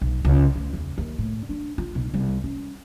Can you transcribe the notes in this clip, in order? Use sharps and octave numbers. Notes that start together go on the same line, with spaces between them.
B1
C#2
D2
E2
D#2
A2
D4
F4
B1
C2
C#4